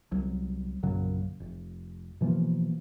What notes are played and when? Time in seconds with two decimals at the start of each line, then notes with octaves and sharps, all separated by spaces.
0.12 C2 F#3
0.83 A#1 F#2 C#3 F#3
1.40 F1
2.21 B2 E3 F3 A#3